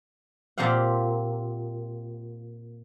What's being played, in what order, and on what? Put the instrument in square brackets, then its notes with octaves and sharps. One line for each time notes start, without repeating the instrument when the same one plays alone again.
[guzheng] A#2 C4 G4 F5 F#5